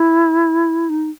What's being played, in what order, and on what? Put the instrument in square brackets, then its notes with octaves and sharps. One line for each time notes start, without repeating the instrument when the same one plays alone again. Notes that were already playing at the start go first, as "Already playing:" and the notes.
Already playing: [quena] E4
D#4